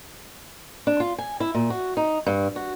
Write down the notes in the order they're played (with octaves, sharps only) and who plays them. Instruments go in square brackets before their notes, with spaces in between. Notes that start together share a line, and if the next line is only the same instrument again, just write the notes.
[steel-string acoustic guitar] D4
F4
G#5
E4
A#2
F#4
D#4
G2
F#4